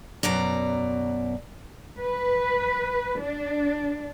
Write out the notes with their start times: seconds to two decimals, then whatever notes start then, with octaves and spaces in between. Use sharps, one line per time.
0.23 F#2 B2 D5 A#5
2.00 B4
3.20 D4